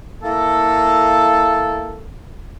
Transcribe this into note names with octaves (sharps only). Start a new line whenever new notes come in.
A#3 E4 A4